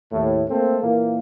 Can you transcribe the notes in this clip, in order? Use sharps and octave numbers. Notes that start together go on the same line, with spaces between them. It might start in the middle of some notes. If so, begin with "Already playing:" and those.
D#2 A2
A3 A#3 C4 A4
A#2 E3 A#3